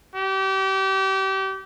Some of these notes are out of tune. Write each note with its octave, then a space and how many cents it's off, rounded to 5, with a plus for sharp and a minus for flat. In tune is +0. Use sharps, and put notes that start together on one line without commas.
G4 -30